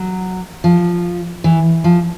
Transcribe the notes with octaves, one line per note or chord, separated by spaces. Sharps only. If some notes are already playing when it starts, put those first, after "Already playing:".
Already playing: F#3
F3
E3
F3